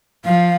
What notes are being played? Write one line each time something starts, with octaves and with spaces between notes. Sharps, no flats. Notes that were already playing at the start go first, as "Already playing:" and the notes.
F3 F5